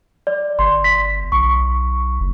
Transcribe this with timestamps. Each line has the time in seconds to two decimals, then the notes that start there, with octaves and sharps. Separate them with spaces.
0.27 D5
0.59 G1 C6
0.84 B6
1.32 B1 C#6
2.20 F#1